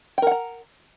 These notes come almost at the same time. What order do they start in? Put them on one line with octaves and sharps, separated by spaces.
G5 A#4 F#5 A#5